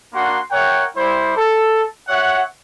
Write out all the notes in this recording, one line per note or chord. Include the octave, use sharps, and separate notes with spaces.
A#3 D4 F#4 A#4 F#5 C6
A#4 C#5 E5 F#5 G5
G3 E4 C5
A4
F#4 C#5 E5 F#5